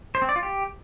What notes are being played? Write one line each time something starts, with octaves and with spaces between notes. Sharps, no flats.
C5
C4
D5
F4
G4